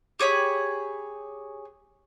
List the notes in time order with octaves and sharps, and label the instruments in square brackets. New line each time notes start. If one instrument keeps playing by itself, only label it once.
[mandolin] G4 G#4 C#5 B5